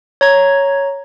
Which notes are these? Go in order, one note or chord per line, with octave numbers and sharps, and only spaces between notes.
C#5 A#5 G#6